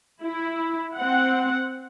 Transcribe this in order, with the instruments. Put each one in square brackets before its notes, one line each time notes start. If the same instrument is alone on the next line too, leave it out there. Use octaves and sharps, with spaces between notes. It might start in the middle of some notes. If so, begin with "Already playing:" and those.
[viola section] E4
C4 F#5